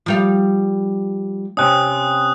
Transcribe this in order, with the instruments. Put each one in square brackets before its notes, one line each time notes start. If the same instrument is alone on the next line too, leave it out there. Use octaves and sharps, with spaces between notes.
[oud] F3 G3 F5
[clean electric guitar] C3 C4 C#4 [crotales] D#6 F#6